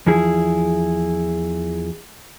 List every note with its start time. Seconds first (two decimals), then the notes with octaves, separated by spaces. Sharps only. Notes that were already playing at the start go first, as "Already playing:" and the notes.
0.06 E2 F3 E4 G#4